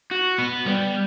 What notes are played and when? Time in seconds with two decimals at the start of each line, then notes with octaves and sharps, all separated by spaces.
0.11 F#4
0.38 B3
0.66 G3